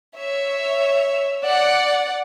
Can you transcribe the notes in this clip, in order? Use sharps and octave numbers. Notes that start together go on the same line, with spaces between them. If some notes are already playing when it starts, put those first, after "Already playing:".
C#5 E5
D5 F#5